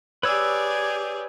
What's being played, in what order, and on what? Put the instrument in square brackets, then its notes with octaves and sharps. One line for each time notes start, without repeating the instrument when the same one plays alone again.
[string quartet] G4 G#4 D5 [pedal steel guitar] B4 C#5 E6